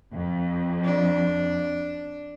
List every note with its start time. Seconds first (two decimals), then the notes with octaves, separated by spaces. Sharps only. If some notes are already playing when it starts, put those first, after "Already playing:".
0.14 F2
0.84 D4